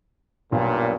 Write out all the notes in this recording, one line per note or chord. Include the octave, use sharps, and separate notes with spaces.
B1 G2 A#2